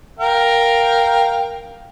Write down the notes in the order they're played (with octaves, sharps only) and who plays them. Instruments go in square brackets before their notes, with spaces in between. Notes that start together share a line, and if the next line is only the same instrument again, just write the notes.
[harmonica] A#4 F5 G5